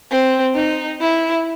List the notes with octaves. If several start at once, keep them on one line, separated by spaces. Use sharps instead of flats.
C4
D#4
E4